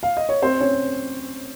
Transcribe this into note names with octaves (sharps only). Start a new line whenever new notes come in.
F5
D#5
C#5
C4 C5
C#4 C#5